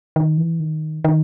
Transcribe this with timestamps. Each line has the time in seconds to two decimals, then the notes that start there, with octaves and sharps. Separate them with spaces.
0.16 D#3
0.37 E3
0.60 D#3
1.05 D#3